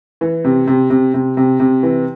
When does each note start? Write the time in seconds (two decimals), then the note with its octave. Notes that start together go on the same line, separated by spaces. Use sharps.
0.21 E3
0.45 C3
0.67 C3
0.90 C3
1.14 C3
1.37 C3
1.60 C3
1.83 E3